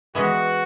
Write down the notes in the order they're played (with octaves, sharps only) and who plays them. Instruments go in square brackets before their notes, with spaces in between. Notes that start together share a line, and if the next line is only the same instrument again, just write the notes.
[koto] E3 G#3 B3 [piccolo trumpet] F#4